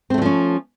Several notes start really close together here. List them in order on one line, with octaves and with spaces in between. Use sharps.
C4 A3 F#3 F3 C#4